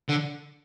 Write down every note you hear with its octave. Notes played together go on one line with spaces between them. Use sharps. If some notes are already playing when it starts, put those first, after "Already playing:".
D3